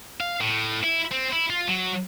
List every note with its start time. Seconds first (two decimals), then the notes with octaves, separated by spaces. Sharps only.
0.21 F5
0.41 A2
0.84 E4
1.12 C4
1.33 E4
1.50 F4
1.68 F#3